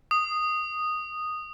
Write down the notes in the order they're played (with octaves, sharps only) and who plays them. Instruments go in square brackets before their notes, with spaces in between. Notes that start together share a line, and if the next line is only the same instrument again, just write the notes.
[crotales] D#6